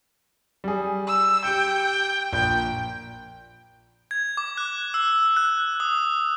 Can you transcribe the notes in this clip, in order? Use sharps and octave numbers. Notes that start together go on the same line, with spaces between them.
G3 G#4
E6
G4 G5 C#7
A#1 G5
G#6
D6
F#6
E6
F#6
D#6